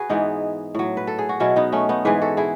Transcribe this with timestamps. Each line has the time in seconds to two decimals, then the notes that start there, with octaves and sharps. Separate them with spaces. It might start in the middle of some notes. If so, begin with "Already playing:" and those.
Already playing: F#4 G#4 B4
0.09 G#2 E3 B3 D#4
0.75 A2 F#3
0.97 B4
1.07 A4
1.19 G#4
1.29 F#4
1.40 B2 F#3 C#4 E4
1.56 B3 D#4
1.72 A3 C#4
1.89 B3 D#4
2.05 G#2 E3 G#4 B4
2.22 F#4 A4
2.37 E4 G#4